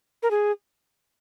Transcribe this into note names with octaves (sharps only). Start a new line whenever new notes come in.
A#4
G#4